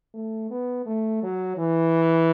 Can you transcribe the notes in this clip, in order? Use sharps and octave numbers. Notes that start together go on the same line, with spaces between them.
A3
B3
A3
F#3
E3